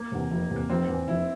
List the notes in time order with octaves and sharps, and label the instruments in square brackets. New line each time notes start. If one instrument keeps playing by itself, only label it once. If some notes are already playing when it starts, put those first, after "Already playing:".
Already playing: [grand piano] A#3
[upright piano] E2 C3
F1
E2 C3
[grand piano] A#3
[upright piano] F1 [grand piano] C4
[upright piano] E2 E3
[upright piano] F1 [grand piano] E4